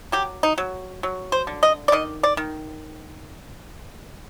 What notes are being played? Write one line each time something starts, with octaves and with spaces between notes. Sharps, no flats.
F#3 G4
D#4
F#3
F#3
C5
D3
D#5
D5
D#3 D#5
D5
D#3